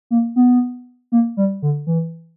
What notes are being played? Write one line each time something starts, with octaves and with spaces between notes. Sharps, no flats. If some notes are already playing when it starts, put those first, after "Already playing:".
A#3
B3
A#3
G3
D3
E3